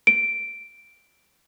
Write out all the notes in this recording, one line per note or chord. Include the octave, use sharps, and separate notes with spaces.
D7